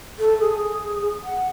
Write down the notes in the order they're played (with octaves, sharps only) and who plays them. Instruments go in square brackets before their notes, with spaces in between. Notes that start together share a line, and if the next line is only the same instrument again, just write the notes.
[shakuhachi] A4
G#4
F#5